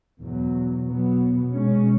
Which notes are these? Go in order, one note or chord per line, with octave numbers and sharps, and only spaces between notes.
E2 B2 F#3
B2 F#3 B3
B2 G#3 C#4